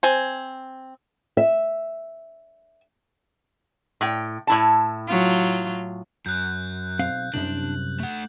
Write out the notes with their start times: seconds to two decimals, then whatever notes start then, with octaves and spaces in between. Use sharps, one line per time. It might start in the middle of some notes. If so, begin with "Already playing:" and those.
0.03 C4 G#5
1.37 E5
4.01 A2 G5
4.47 A2 E4 A5
5.08 F#3 F4
6.26 F#2 F#6 G6
6.99 B1 C4 F5
7.34 C2 F#2 C3 D4 F#7
8.00 A3 F#5